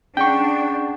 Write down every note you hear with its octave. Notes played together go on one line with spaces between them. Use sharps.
C#4 D4 G#4 F#5 G5 C#6